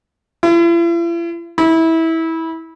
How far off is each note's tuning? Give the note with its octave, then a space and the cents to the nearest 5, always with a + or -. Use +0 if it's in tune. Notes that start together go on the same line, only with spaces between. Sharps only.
E4 +45
E4 -20